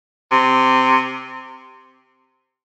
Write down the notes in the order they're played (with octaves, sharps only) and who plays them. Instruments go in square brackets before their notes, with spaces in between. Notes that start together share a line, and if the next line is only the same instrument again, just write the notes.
[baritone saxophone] C3